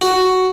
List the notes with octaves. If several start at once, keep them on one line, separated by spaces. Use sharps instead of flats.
F#4